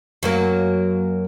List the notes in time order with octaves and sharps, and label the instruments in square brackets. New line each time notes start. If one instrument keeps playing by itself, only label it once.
[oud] F#2 F#3 A#3